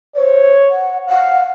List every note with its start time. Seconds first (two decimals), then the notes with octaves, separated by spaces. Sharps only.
0.16 C5 C#5
0.69 F#5
1.08 F5 F#5